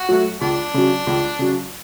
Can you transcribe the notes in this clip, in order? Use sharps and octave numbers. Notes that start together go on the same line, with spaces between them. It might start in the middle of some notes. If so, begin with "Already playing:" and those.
Already playing: F#4
F#3 A3
C#2 D4
C#3 F#3
C#2
C#3 F#3